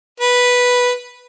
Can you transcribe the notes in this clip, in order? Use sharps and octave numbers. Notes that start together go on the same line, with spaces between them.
B4